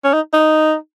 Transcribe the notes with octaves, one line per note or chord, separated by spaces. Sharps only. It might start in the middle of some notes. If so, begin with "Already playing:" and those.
C#4
D#4
D#4